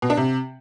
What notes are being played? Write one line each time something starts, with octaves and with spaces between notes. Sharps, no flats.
B2
D4
C3